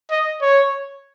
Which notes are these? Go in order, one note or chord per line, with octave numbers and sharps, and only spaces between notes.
D#5
C#5